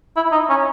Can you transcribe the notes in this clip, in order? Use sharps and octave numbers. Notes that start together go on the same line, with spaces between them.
E4
D#4
C#4